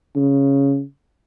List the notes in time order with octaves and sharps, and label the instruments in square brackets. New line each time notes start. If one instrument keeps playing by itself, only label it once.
[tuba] C#3